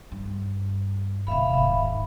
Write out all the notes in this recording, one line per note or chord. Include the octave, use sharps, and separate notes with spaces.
G2
D#1 A2 C3 E5 F5 B5
G#1 D#2